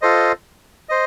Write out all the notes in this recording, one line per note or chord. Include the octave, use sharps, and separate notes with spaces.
F4 A4 C5 D#5
C5 D#5